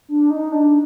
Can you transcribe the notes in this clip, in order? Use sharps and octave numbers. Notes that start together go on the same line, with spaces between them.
D4
D#4
D4